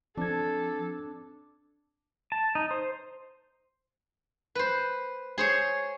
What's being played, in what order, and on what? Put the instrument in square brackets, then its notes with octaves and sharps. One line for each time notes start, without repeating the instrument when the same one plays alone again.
[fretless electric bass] F3 [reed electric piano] C4 G#6 [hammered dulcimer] D4 [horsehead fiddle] A4
[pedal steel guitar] A5
D#4
C5
[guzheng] B4 C5
G#4 C5 C#5